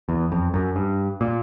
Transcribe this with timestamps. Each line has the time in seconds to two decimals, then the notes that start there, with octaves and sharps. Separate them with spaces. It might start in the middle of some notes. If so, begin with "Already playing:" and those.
0.09 E2
0.32 F2
0.54 F#2
0.76 G2
1.21 A#2